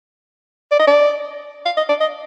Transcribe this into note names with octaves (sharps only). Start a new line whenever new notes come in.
D5
D#5
D5
F5
D#5
D5
D#5